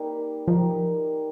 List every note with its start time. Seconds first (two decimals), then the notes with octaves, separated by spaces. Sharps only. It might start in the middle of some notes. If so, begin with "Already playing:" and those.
Already playing: G3 A#3 D#4 G4
0.47 F3 A#3 D#4 G4 A#4